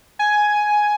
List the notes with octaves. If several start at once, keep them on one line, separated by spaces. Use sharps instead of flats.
G#5